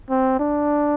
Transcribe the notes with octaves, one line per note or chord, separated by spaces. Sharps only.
C4
D4